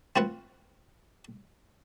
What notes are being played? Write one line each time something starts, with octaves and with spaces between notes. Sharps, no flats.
C4 F4 F#4 B4 F#5